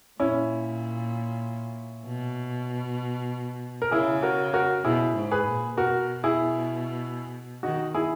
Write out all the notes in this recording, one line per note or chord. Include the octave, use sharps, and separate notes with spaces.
A#2 C#4 E4
B2
A#4
C#3 E4 G#4
F#4 A#4
F#4 A#4
B2 E4 G#4
G#2
G#4 B4
A#2
B2 F#4 A#4
E4 G#4
D#3 D#4 F#4
E4 G#4